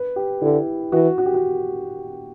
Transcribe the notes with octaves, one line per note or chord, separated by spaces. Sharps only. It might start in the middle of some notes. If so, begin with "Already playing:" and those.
Already playing: B4
G4
D3 E4
E3 F#4
F#4
G4
F#4